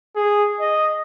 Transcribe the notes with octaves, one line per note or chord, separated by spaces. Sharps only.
G#4
D#5